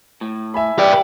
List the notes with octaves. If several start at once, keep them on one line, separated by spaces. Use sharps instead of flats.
A2
E5 G#5 B5
G4 B4 D5